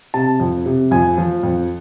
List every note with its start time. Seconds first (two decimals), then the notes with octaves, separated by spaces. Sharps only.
0.14 C3 A5
0.40 F2
0.66 C3
0.91 F2 G#5
1.18 F3
1.43 F2